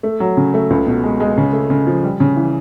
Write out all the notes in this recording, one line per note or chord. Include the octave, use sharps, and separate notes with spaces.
A3
F#3
C#3
A3
C#2
B2
G#3
G#3
C#3
A3
C#3
F3
G3
C#3
E3